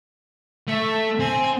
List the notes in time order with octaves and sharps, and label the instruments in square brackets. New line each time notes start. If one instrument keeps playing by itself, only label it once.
[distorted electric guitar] A3 [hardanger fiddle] E5
[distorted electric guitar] C4 [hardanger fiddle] G#5